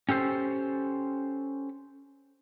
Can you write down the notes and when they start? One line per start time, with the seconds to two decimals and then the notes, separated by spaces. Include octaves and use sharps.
0.09 C#4 G4 A4 C5